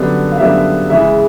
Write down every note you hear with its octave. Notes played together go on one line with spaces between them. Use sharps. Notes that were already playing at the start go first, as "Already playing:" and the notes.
Already playing: F#2 D3 G3 B3 D4
F5
F#2 D3 G3 B3 D4 E5
C#3 E3 G#3 E5